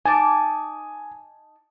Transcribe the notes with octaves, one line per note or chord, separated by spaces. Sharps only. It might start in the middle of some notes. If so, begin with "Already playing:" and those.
D#4 G#5 A5 D6